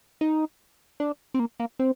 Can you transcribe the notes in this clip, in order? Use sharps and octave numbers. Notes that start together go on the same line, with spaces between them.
D#4
D4
C4
A#3
A#3
C4